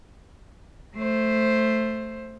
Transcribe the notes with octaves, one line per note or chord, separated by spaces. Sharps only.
A3 C5